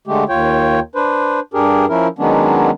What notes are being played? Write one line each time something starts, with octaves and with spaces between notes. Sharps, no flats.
D3 G#3 A3 G4
D#2 F4 C#5 G5
D4 B4 C5
G2 D4 G4 G#4 A#4
F3 C#4 E4 A#4
D#3 F#3 G#3 B3 C#4 D4